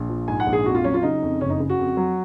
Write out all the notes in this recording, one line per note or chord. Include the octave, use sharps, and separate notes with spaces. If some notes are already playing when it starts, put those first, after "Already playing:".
Already playing: A#1
F3
G#2 G#5
F#5
A#1
G#4
F2 F#4
F4
F#3 C#4
F4
C#3 D#4
F2
F#1 C#4
D#4
C#3
F#4
F2
F#3